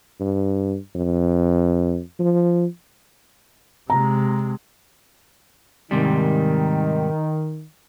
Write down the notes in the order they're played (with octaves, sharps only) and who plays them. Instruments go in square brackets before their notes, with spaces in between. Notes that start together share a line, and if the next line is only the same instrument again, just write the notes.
[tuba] G2
F2
F3
[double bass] C3 G#3 [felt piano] A#5
[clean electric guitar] G#2 C3 G3 [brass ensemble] D#3